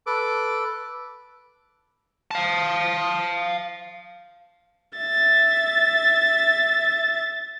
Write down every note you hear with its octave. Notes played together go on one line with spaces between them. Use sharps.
A4 B4 D6
F5 A5
E5 A6